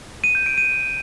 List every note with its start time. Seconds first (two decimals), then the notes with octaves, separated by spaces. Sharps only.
0.24 D#7
0.35 G6
0.46 D7
0.58 D#7